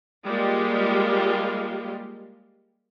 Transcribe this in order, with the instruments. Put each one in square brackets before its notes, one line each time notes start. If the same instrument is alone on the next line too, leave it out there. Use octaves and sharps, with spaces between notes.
[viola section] G3 G#3 A#3 F4 G4